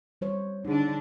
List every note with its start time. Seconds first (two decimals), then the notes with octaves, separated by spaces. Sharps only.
0.21 G3 C5 C#5
0.65 D3 D4 D#4 G#4